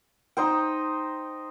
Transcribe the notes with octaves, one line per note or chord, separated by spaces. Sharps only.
D#4 C5 G5